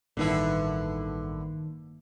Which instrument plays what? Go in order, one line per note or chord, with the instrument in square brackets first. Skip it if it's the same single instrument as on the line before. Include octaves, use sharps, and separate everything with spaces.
[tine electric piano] A1 G2 A4 [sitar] D3 B3 E4 [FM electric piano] D#3 A#3